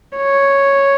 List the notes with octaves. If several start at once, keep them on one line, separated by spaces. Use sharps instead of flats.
C#5